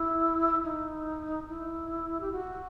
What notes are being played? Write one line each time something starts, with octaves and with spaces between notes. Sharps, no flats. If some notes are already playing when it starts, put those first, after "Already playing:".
Already playing: E4
D#4
E4
G4
F#4